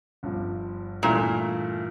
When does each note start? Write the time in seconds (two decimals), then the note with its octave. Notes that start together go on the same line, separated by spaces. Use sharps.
0.23 G1 G2 F3
1.03 G2 A#2 E3 A3 E4